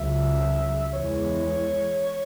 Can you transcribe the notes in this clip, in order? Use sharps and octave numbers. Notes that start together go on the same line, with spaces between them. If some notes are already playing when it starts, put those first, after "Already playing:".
Already playing: C#2 C#3 F#3 E5
E2 E3 G#3 C#5